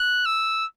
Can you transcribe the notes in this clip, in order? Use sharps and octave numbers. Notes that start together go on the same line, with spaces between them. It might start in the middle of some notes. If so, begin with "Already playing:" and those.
Already playing: F#6
E6